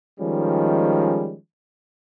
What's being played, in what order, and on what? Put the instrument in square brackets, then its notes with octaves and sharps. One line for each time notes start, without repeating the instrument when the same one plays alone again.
[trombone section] D#3 F3 G3 G#3 C#4